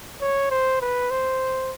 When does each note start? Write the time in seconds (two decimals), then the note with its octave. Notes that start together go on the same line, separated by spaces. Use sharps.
0.21 C#5
0.51 C5
0.81 B4
1.11 C5